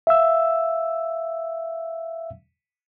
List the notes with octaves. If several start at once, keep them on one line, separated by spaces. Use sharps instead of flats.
E5 F5 E6